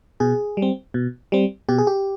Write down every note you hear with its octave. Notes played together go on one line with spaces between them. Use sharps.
B2 G#4
G3
C4
B2
G3 C4
B2 G4
G#4
G4